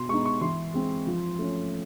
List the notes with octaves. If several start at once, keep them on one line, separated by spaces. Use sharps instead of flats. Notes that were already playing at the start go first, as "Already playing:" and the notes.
Already playing: B2 C6
G#3 B3 D#4 C#6
C#6
E3 C6
G#3 C4
F3
A3 C#4